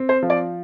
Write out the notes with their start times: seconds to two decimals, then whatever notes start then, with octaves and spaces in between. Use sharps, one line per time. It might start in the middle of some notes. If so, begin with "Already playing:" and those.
Already playing: C4
0.09 C5
0.23 F3
0.30 D5